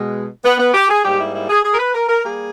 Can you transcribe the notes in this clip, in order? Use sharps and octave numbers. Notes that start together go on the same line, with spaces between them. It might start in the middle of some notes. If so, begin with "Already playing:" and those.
Already playing: B2 G#3
B3
B3
G4
G#4
G#2 G3 A#3 G4
E4
E4
G#4
G#4
A#4
B4
A#4
A#4
G3 A#3 G#4